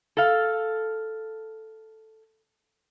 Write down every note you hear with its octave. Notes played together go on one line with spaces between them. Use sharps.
A4 F5